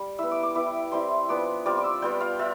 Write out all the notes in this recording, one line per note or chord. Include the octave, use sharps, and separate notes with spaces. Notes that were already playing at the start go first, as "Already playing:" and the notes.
Already playing: G3
B3 E4 E6
D6
D6
B3 E4 D6
G3 C4 E4 C6
F3 B3 D4 D6
G3 C4 F4 D6
D6
E6
G3 B3 F4 G5
F5
F4 E5